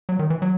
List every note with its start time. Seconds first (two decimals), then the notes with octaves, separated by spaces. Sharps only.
0.09 F#3
0.19 D#3
0.30 E3
0.42 F#3